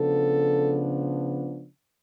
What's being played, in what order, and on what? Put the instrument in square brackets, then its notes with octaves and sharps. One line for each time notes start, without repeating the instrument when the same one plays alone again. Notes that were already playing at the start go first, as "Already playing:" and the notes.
Already playing: [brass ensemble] C#3 F3 B3 D4 A4